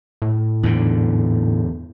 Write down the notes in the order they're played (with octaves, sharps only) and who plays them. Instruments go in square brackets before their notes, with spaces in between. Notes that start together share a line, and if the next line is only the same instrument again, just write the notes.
[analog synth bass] A2
[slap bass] E2 G#2 D3